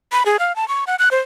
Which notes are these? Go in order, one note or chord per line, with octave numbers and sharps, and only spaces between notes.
B5
G#4
F5
A5
C#6
F#5
F#6
C5